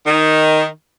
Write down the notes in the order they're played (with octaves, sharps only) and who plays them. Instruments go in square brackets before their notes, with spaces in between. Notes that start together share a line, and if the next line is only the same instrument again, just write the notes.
[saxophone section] D#3